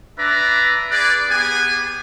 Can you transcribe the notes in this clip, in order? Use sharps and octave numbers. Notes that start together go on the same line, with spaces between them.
D4 B4 D5 E5 A#5
G#4 B4 D5
B3 G4 G#4 F#5 G#5